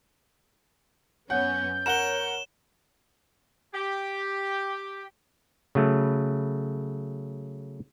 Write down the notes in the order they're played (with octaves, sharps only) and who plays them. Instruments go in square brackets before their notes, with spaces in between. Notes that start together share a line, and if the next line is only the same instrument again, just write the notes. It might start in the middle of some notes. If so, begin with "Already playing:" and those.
[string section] F#2 B3 C#4 [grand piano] F#5 [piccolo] G6
[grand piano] A#4 F#5 [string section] C#5 [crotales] E7 G7
[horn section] G4
[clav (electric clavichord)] C#3 F#3 A3